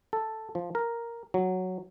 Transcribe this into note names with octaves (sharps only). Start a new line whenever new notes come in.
A4
F3
A#4
F#3